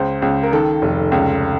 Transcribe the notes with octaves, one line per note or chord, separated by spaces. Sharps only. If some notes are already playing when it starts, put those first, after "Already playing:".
Already playing: C#2 C5
C#2
A#4
D#3 A4
F1
C#2